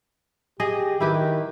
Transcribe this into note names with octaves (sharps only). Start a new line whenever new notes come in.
G4 G#4 D#5
D#3 E4 G4 B4